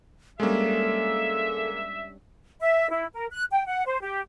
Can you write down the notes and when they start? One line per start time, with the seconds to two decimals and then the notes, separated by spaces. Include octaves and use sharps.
0.40 G3 G#3 A#3 C#4 D4 A4 E5
2.61 E5
2.90 E4
3.14 A#4
3.31 F#6
3.51 G5
3.67 F#5
3.85 C5
4.01 G4